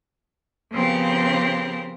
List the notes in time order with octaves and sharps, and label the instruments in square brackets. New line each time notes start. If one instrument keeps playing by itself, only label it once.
[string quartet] C#3 F3 B3 C4 G4 A#4